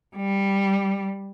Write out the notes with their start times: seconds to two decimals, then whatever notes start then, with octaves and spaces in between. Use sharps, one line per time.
0.16 G3